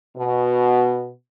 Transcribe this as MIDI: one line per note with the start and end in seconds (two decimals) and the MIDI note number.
0.18 1.10 47